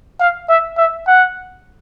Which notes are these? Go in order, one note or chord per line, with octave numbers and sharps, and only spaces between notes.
F5
E5
E5
F#5